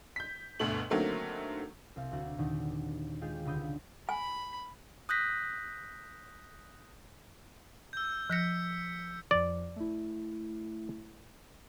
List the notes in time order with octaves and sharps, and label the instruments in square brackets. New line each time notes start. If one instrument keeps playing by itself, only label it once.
[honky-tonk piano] G6 B6
G1 D2 B2 A3 F#7
D3 D#3 F#3 A3 A#3 C4
[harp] C2 C4 F5
D2 F#4 F#5
D#2 A#2 D3 D#3
G#3 D#4 F4 G4 G#4
C#2 D3 B5 D#6 G6
[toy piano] G#5 [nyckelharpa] B5
[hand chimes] D#6 F#6 G6 A#6 B6
[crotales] E6 G6
[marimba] F3 F#6 A#6 [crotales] G6 B6 C#7
[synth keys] F2 F3 [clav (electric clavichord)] D5
[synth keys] A3 E4